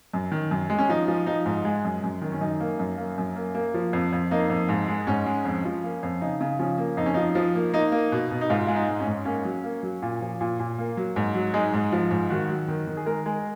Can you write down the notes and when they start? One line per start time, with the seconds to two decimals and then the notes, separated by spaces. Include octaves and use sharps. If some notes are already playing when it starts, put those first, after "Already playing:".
0.14 F#2
0.32 D#3
0.51 F#2
0.70 G#3
0.79 C#4
0.89 F3 D#4
1.08 F3
1.26 F3 D#4
1.46 G#2
1.65 G#3
1.85 F#2
2.03 F#2
2.22 D#3
2.32 C#4
2.41 F#2 D#4
2.60 A#3
2.79 F#2
2.98 A#3
3.18 F#2
3.36 A#3
3.55 A#3
3.74 F3
3.93 F2
4.13 F2
4.31 A#3 D#4
4.50 F2
4.69 G#2
4.88 G#3
5.07 G#2 C#4
5.26 G#3
5.45 F2
5.65 F3
5.84 A#3
6.03 F2
6.21 C#3 D#4
6.41 C#3
6.59 F3 C#4
6.78 A#3
6.97 F2 D#4
7.06 C#4
7.14 F3 D#4
7.35 F3
7.55 A#3
7.73 A#3 D#4
7.92 A#3
8.12 B2
8.31 B2
8.41 D#4
8.50 G#2 F4
8.67 G#3 F4
8.75 D#4
8.88 G#2
9.00 C#4
9.07 G#2
9.25 A#3 C#4
9.45 F#3
9.64 A#3
9.83 F#3
10.02 A#2
10.21 F3
10.41 A#2
10.60 A#2
10.78 A#3
10.97 F#3
11.16 G#2
11.34 F#3
11.54 G#3 D#4
11.73 G#2
11.92 F3
12.11 G#2
12.30 D#3 F#4
12.50 F#3
12.68 D#3
12.87 D#3
12.97 G#4
13.06 G#3 A#4
13.26 G#3